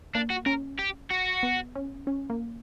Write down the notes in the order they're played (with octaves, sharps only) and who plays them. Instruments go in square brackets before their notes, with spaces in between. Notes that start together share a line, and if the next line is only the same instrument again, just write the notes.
[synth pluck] A#3 [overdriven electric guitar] D4
[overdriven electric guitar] F#4
[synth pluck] C#4 [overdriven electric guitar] A#4
[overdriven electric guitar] G4
F#4
[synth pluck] B3
C#4
C#4
A#3